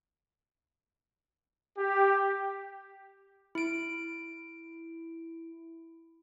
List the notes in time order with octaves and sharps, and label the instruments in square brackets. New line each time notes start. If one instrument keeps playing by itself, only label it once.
[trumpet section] G4
[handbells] E4 D7